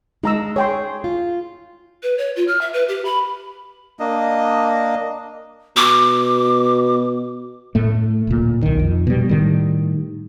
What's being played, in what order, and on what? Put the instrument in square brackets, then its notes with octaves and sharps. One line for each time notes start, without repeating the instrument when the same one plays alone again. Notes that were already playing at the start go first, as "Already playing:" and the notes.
[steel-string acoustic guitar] G#3 [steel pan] D#4 A#5 E6
[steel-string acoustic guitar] G#4 [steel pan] C#5 G5 C6
[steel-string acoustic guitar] F4
[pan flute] B4
C#5
F4
F6
E5
B4
G4
B5
[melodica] A#3 D4 D#5
[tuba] B2 [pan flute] D6
[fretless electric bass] A2 A3
D1 A#2
B1 D#3
F2
B2 G3
A2 D#3 G3